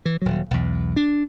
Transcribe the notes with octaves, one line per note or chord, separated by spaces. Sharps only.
E3
D#1 F#3
B1 E2
D4